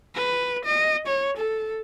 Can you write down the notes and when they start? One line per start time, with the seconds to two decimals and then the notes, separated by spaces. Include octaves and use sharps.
0.15 B4
0.65 D#5
1.07 C#5
1.37 A4